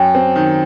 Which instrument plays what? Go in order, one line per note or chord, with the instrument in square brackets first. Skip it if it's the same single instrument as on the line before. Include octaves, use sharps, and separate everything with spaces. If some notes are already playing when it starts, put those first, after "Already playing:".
Already playing: [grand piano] F#2 [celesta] G5
[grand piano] C4
D#3